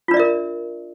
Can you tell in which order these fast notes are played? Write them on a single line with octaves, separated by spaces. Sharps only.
F4 D4 D5 E5 A#4